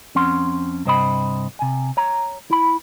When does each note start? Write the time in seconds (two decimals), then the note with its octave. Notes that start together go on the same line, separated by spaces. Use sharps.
0.15 F2 C4 C#4 F#5 C6
0.85 G2 C3 C5 D#5 G5 B5
1.59 C3 G#5
1.97 C#5 A#5
2.51 E4 B5